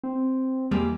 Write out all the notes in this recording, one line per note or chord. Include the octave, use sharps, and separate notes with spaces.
C4
E2 G3 G#3 A#3